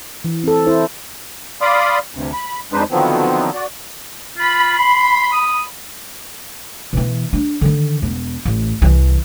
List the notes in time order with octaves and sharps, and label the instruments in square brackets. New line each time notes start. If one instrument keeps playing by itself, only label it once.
[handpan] E3
C4 A4
E4 C5
[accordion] D5 F5 B5 C6 D6 D#6
D2 G2 C3
B5
F2 G#3 D4 D#4 B4 C5
D3 D#3 F3 F#3 B3 C4
F#4 D5
[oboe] F4 [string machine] B5
[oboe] C6
D#6
[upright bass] B2 E3
D4
D3 D#3
E1 B3
A1
C2 E3